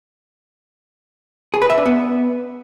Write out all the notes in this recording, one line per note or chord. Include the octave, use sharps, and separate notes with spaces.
G#4
B4
E5
D4
B3